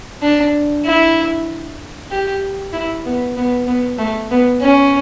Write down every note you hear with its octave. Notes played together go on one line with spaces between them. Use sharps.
D4
E4
G4
E4
B3
B3
B3
A3
B3
C#4